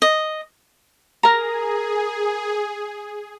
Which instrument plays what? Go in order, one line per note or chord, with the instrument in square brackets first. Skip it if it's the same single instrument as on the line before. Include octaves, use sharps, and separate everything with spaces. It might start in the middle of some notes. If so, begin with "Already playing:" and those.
[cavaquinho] D#5
[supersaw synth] G#4 [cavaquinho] A#4 A#5